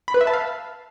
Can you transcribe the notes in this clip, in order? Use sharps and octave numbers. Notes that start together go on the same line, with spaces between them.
B5
B4
E5
A5
F5